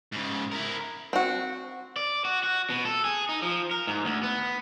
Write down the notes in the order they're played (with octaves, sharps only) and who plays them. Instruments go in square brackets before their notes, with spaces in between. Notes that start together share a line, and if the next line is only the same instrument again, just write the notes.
[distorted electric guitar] G#2 C#3
E4 A#4
[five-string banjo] C4 F#4
[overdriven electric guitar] D5
F#4
F#4
B2
A4
G#4
D#4
F3
A#4
G#2
D2
B3